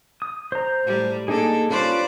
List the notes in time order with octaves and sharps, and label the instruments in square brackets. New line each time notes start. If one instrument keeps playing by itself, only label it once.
[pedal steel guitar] D#6
C5 A#5
[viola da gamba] A2 G3
[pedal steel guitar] A#3 D#4 G#4 [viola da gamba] D4 A4
[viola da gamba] G3 C5 D5 [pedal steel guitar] C#4 F4 B4